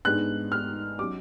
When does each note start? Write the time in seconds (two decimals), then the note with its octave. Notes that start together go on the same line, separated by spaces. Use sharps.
0.05 G#2 G#3 B3 D4 F#6
0.52 F6
0.99 F#3 C#4 D6